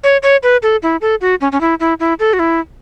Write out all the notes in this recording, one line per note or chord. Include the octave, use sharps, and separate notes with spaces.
C#5
C#5
B4
A4
E4
A4
F#4
C#4
C#4
E4
E4
E4
A4
F#4
E4